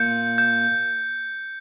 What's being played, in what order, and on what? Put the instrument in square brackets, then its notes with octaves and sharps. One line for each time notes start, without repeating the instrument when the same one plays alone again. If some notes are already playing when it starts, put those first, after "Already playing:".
Already playing: [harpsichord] A#2 [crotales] G6 C#7
[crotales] G6